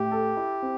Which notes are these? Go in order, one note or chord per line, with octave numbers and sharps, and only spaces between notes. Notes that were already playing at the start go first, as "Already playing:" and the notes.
Already playing: A2 G4
A4
E4
C4